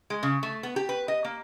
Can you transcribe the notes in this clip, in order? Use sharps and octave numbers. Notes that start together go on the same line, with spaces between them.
G#3
C#3
A3
B3
G4
B4
D#5
A#3